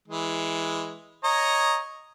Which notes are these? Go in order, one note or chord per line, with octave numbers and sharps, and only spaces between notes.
E3 G#3
C#5 D#5 A#5